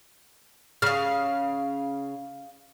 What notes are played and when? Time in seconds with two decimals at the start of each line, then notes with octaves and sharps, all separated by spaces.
0.82 C#3 F5 F6